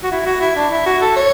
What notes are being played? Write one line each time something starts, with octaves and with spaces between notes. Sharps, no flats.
F#4
E4
F#4
E4
D4
E4
F#4
A4
C#5